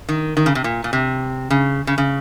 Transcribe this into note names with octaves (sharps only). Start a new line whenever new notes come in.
D#3
D#3
C#3
C3
A#2
A#2
C3
C#3
C#3
C#3